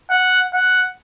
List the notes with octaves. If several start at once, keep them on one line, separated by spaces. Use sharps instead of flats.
F#5
F#5